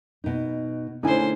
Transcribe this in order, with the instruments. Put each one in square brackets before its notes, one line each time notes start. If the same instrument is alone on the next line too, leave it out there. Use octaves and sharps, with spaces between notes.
[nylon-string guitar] B2 D#4
[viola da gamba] D3 A3 C5 [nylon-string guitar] C#4 [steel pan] D#4 E4 G#5